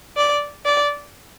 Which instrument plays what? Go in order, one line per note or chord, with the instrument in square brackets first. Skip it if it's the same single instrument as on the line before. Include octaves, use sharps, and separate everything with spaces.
[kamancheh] D5
D5